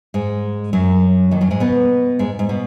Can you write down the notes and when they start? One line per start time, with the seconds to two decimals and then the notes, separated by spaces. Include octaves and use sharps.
0.14 G#2 G#3
0.73 F#2 F#3
1.31 D#2 D#3
1.41 F#2 F#3
1.51 G#2 G#3
1.60 B2 B3
2.19 G#2 G#3
2.39 G#2
2.49 B2